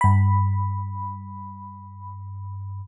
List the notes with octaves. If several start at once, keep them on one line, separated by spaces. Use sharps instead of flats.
G2 B5